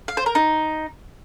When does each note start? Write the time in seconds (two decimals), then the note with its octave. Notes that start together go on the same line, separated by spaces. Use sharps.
0.08 F5
0.17 C5
0.26 A#4
0.35 D#4